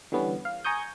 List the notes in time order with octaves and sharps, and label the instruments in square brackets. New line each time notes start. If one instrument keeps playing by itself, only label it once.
[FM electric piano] D3 E3 G3 B3 C#4
F5
G#5 A#5 C#6 D#6 G6